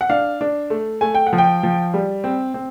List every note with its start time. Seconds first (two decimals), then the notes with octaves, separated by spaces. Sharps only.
0.01 F#5
0.10 D4 F5
0.41 D4
0.70 A3
1.01 A3 G#5
1.15 G5
1.27 F#5
1.33 F3
1.38 G5
1.63 F3
1.94 G3
2.24 C4
2.54 C4